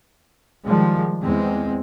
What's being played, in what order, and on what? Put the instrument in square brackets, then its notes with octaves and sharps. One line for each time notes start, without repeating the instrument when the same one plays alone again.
[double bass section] D#3 F3 G3 G#3
E2 G#3 C4